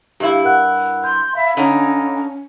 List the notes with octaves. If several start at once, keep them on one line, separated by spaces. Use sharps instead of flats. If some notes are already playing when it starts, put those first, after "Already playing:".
G2 E4 G4 E5 F5
A#4 F#5 F#6
C6 G6
E5 F5 B5
D3 C#4 D#4